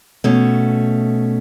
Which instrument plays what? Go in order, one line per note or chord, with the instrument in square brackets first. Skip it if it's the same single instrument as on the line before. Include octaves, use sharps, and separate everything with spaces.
[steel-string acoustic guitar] B2 A3 C#4